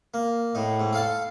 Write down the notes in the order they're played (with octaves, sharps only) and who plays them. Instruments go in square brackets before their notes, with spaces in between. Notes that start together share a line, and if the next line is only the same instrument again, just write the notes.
[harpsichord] A#3
[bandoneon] A2 [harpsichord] D#4
[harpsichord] G#2
A4 F5 A5